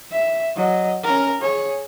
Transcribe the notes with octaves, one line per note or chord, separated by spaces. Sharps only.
E5
F#3 D#5
C#4 A#4
G#4 C#5